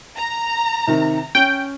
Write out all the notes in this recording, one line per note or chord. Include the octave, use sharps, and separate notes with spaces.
A#5
C3 D#3
C#4 G5